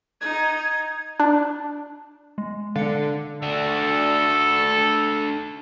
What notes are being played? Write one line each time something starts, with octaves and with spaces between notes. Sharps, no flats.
D#4 G#6
D4
G#3
D3 F5 C#7
D4 F#4 A4